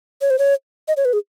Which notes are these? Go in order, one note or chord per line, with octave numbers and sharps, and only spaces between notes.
C#5
C5
C#5
D#5
C#5
B4
G#4